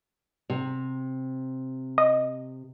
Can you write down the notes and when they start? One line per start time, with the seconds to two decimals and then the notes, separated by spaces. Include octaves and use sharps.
0.50 C3
1.98 D#5